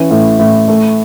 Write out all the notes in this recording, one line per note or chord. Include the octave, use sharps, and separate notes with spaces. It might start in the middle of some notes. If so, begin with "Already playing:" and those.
Already playing: E3 C#4
A2
A2
A3